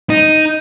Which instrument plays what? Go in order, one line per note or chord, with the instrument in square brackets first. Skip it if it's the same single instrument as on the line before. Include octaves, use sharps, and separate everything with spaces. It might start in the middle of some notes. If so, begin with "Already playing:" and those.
[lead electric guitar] D#4